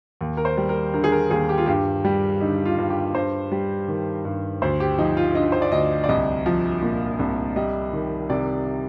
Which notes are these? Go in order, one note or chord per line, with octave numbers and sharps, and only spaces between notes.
D#2
A#4
C5
G3
A#4
D3 A#4
G#4
A#4
D#2 G#4
G4
F4
G2 G4
G3
D3 D#4
F4
G2
G4
G2 C5
G3
D#3
G2
D2 C5
G4
F3 D#4
F4
D3 D#5
C5
D5
D2 D#5
D5
C2 D#5
F3
A#2
C2
G3 D#5
D#3
C3 D5